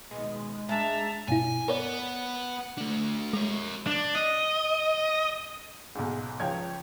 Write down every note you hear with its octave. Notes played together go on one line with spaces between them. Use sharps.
D#2 B2 G#3
G#3 D4 E5 A5 A#5
G2 B2 E4 G#5
B3 A#4 C#5 D5
A3 D4
G#3 A#4 C#5
D4
D#5
B1 G#2
C#2 F3 C#5 G5 G#6